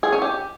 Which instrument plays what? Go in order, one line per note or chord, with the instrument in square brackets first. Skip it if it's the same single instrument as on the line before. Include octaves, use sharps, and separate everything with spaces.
[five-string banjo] G#4
C#4
G4